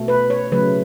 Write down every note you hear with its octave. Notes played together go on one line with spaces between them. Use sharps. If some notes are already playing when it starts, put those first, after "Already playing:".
Already playing: B2 A3
B4
C#5
C#3 F#3 A3 B4